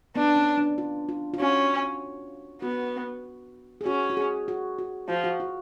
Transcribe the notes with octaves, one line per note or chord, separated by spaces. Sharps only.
B3 D4
C#4
D4
F4
F4
F4
C#4 F#4
B3 F#4
G#4
C#4 F#4
F#4
G#4
F#4
F#4
F3 F#4
F#4
F4